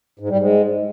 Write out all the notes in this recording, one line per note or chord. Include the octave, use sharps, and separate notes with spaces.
G#2
G3
G#2